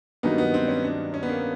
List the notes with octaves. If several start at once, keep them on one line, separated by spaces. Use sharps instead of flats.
G2 D#3 F#3 A#3 B3 D#4
B3
C4
C#4
D4
C#4
B3
A#3